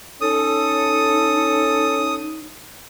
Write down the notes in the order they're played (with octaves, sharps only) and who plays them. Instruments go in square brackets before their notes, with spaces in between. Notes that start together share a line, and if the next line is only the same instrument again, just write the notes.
[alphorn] C#4 [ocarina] D#4 [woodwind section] A4 [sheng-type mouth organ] D#6